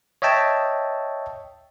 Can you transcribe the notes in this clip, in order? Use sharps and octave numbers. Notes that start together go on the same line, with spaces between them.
C#5 D#5 E5 G5 A5